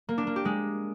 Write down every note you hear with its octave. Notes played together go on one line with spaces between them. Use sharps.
A#3
D4
A#3
G4
G#3